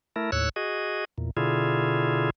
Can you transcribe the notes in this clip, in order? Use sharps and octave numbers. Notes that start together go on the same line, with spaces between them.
A3 E4 A#4
D#2 A2 C#5 E6 F#6
F#4 G#4 D#5
E2 A#2
B2 D3 E4 F4 G#4